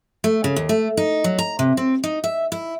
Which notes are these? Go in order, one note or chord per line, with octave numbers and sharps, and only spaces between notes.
A3
C#3
D#2
A3
D#4
F#3
A#5
C3
C4
D#4
E5
E4